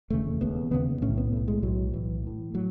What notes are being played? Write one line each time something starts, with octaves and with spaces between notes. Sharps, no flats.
E1 D#2 C#3 A3
E1 D#2 C#3 B3
E1 D#2 C#3 B3
B1 A2 C#4
B3
B1 A2 A3
G#3
B1 A2 F#3
B1 A2 E3
A1 A2
A2 F#3